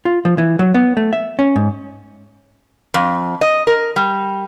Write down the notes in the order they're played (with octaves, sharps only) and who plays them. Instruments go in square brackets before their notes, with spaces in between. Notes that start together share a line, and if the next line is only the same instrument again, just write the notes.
[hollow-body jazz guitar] F4
F3
E3
F#3
B3
A3
E5
C#4
G#2
[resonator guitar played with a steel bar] F2
D#5
A#4
G3